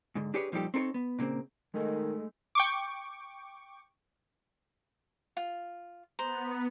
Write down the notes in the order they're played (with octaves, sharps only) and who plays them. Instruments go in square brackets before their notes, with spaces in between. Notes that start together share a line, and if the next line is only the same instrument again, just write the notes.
[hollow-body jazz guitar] G#2 D3
D4 G4 G#4 B4 C#5
A#2 F3 G3 D#4 G4 A4
C4 D#4 A4 A#4 C#5
B3
A#2 C#3 A#3 C4
[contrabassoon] D#3 [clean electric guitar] G#3 A3 D#4
[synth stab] G5 C#6 D6
[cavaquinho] F4
[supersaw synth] B3 [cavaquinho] C5 [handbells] A#5